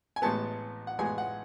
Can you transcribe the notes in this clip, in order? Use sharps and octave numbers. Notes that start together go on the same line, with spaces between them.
G#5
A1 A2 G#3 B3 A5
F#5
A1 A2 G#3 B3 G#5
F#5